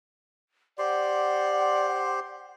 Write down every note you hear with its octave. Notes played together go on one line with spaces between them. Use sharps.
G4 C5 D5 F#5 C6